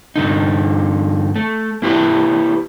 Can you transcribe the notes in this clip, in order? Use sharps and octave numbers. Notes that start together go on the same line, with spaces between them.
G2 D3 D#4
A3
A#3 E4 G4 B4